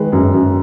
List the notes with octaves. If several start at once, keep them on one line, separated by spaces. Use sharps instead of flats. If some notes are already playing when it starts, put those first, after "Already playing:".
Already playing: D#3 G#3 B4
F#2
F#2